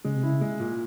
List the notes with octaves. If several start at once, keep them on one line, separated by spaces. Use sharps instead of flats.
C#3 G#3
C3
C#3 E4
G#3
A#2